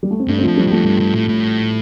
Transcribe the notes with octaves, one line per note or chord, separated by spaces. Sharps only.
G3
A3
C4
G2 A3 D4
C4
F3 A3
F2
G3 C4
F2 F3 A3
G2
G2
A2
A2